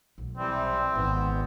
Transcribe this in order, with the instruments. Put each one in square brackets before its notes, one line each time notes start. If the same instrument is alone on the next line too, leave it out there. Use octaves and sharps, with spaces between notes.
[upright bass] B1
[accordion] C3 E3 G3 [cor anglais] C4
[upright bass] G#1 [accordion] B3